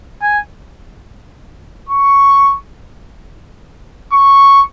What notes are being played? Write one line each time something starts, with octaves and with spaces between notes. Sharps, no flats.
G#5
C#6
C#6